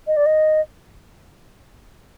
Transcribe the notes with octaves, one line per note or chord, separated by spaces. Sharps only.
D#5
D5
D#5